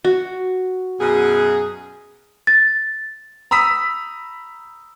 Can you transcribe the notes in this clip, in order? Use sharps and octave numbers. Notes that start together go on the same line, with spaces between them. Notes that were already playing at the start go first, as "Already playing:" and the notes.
F#4
F#2 B2 G#4
A6
A#5 B5 D#6 E6 B6